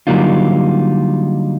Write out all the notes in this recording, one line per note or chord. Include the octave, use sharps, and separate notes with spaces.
D3 F#3 G3 A#3 D#4 F4